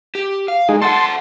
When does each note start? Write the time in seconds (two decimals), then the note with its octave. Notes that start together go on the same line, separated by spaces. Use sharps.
0.15 G4
0.48 F5
0.69 G#3 D#4 G#4
0.82 A4 E5 F#5 A5 C6